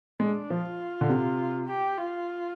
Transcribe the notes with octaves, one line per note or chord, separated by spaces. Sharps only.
G#3 D4
F3 F4
D3
C3
G4
F4